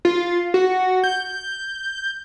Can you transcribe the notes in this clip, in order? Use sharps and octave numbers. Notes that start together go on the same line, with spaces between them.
F4
F#4
G6